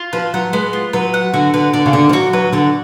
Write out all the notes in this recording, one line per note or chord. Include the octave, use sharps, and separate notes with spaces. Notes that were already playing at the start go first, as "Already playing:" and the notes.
Already playing: F4
F3 B4
F#3 F#5
G#3 B3
F4
F#3 B4
F#5
D3 F#4
D3 B4
D3 D5
C#3
D3 F#5
F3
F#3 F#4
F#3 B4
D3 D5